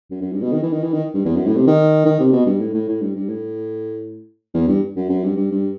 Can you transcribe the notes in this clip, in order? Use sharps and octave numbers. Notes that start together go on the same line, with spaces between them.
F#2
F#2
G2
B2
D#3
E3
D#3
E3
D#3
G2
E2
F#2
A2
C3
D#3
D#3
C3
B2
G2
A2
A2
A2
G2
G2
A2
E2
G2
F#2
F#2
G2
G2
G2